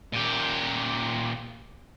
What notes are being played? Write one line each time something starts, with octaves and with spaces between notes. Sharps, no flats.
A#2 G4